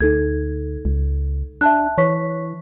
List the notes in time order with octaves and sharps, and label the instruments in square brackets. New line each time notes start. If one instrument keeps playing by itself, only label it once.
[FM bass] D2 [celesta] D#4 A4 G#6
[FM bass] C#2
[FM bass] D4 [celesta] E5 A5 F#6
[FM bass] E3 [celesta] C#5 C#6 B6